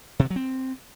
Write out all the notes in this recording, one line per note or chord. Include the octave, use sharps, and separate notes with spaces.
C3
D3
F#3
C4